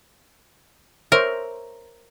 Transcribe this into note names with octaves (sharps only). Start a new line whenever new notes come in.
A#4 C5 C#5 E5